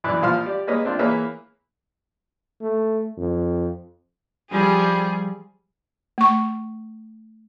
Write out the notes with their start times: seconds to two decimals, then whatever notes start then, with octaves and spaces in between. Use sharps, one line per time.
0.04 A#1 F#2 E3 E4 D5 F#6
0.22 A#1 A#2 F3 F5 C6 F6
0.46 G4 D5
0.67 G#3 A#3 B4 C#5 D#5
0.85 C4 D4 F4
0.99 E3 A#3 G#4 B4 C#5 E5
2.62 A3
3.18 F2
4.51 F3 G3 G#4
6.18 A3 C#6